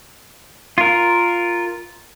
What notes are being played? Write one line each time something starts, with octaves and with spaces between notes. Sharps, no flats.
F4 A#4